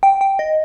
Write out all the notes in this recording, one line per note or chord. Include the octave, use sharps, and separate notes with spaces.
G5
G5
D#5